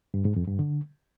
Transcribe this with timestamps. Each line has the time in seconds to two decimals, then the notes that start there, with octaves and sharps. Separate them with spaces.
0.14 G2
0.25 G#2
0.36 F2
0.48 G2
0.59 D3